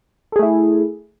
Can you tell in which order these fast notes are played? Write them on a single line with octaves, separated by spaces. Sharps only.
A4 G#4 A3 E4